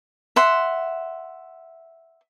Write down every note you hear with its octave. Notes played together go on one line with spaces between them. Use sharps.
E5 F#5 C6